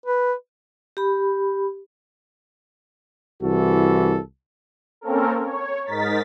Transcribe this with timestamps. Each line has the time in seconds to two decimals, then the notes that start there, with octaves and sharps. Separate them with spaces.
0.06 B4
0.97 G4 B5
3.42 C2 E3 F#4 A4
5.01 A#3 C4 C#4 A4 A#4
5.40 C#5
5.86 G#2 D#4 A#4 A6 B6